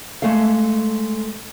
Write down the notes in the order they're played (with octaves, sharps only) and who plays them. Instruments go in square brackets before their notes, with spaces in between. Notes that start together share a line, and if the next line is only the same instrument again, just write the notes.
[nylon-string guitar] G#3 A3 A4 F5